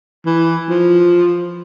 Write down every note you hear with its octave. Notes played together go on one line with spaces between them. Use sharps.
E3
F3